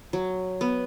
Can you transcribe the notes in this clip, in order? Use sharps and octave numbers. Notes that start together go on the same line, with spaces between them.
F#3
B3